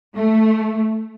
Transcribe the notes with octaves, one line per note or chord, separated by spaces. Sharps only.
A3